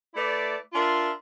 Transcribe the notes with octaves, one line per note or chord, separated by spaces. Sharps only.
A3 E4 B4 D5
D4 F4 A#4 E5 C6